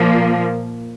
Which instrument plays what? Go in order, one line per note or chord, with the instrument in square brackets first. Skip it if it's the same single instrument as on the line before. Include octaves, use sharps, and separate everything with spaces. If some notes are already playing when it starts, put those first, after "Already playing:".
Already playing: [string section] A#2 F3 A#3